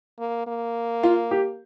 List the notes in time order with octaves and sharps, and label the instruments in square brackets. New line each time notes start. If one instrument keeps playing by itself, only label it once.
[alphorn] A#3
A#3
[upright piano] F4
G4